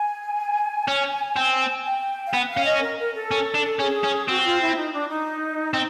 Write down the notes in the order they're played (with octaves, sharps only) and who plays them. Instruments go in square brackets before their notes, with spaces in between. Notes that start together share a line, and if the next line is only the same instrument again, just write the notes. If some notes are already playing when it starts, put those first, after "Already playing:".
Already playing: [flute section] G#5
[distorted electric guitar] C#4
C4
[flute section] G5
F5
[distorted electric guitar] B3 [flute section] F#5
[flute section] F5
[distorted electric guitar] C#4
[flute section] D#5
A#4
A#4
A4
[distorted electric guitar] C#4
D4
[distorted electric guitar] C#4 [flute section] G#4
[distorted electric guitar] C#4
[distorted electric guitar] C4 [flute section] F#4
[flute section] F4
E4
D#4
D4
D#4
[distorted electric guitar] C4